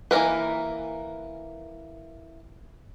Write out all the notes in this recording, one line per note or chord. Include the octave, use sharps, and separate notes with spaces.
E3 A#3 B3 A#4 B4